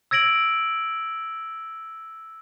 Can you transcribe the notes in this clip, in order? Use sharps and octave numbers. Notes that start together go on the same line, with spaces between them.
E6 G#6 A#6 D7 F#7